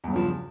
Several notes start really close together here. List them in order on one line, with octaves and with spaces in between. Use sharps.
E2 G2 C#3 F3